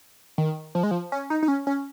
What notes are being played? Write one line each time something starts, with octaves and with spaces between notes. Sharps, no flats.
D#3
F3
G#3
F3
C#4
D#4
D#4
C#4
C#4